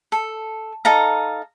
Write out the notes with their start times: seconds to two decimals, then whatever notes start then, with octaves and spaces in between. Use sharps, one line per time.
0.12 A4
0.85 D#4 A4 F5 A#5